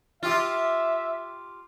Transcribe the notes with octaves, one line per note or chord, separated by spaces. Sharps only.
F4 G4 E5